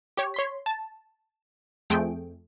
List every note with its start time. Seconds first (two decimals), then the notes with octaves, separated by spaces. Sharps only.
0.17 G4 C#5
0.34 C#5 C6 B6
0.66 A5
1.90 F2 A3 C4 G#4 G5 D7